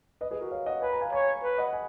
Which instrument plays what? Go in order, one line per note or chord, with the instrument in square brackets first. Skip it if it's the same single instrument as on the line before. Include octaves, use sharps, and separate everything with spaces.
[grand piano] B4 D#5
G#4 B4
F#4 A#4
C#5 F5
D#5 F#5
[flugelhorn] B4 [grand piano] G#5
[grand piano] A#5
F5 G#5
[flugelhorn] C#5 [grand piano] G#5 B5
[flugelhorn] B4
[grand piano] D#5 F#5
G#5